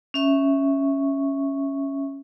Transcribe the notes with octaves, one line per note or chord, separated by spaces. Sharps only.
C#4 E5 C#6